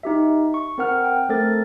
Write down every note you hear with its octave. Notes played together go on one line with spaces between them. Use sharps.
D#4 G4 E5
C#6
C4 A#4 F#5 F6
G5
A3 C4 A4 A#4 A6